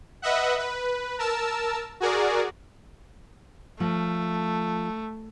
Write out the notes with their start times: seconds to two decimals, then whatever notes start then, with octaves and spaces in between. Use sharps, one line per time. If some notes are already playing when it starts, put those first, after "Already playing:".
0.22 B4 D#5 E5 F#5
0.58 B4
1.18 A#4 A5 E6
2.00 F#4 G#4 A#4 D5
3.80 F3 A3